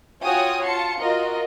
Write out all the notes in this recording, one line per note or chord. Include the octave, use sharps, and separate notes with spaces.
F4 F#4 C#5 G5 G#5 D#6
F4 A5 C6 C#7
F4 F#4 A#4 D#5